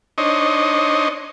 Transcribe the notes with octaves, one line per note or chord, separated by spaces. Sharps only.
D4 D#4 C5 C#5 D#5